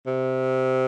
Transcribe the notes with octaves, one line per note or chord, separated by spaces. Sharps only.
C3